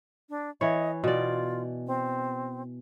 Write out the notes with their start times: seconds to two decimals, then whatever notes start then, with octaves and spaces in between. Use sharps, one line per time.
0.29 D4
0.61 E3 C#5 D#5
1.04 B2 F4 D5
1.87 C4